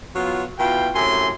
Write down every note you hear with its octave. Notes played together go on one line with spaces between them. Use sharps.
F#3 B3 F4
B2 E4 F4 G5
F#2 A2 C3 G#5 C6